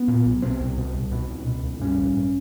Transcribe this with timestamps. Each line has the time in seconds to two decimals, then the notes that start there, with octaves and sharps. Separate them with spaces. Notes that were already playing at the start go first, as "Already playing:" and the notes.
Already playing: B3
0.08 A#2
0.26 B1
0.42 B2 C4
0.60 C2
0.78 B2
0.94 C2
1.12 B2
1.28 C#2
1.47 B2
1.64 C#2
1.81 G2 C#4
1.98 A1